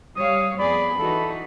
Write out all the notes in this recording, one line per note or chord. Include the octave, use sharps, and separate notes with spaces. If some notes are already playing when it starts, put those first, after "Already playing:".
G3 C#5 F5 D#6
F2 B3 G#4 D5 B5
E3 D#4 F#4 A4